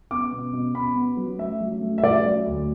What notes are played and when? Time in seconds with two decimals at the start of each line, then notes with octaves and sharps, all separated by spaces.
0.11 B3 D6
0.32 B2
0.53 B2
0.75 B2 B5
0.96 B3
1.17 F#3
1.38 A3 E5
1.60 F#3
1.81 A3
1.98 E5
2.03 F#3 D5
2.25 F#3
2.46 D2